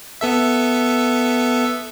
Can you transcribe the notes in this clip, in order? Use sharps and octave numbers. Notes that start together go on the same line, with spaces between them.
B3 A4 E5